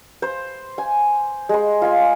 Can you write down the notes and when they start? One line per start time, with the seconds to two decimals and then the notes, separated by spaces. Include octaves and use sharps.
0.22 C5
0.78 G#5
1.49 G#3 C6
1.82 F4 G#5